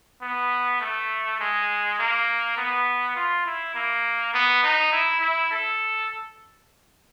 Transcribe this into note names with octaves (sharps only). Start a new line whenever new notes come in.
B3
A3
G#3
A#3
B3
F4
E4
A#3
B3
D#4
E4
E4
A4